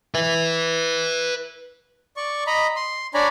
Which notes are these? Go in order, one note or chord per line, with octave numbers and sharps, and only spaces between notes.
B4 E5
D5 C#6
D#5 A#5 B5
C6
D4 C#5 D5 G#5 A#5 B5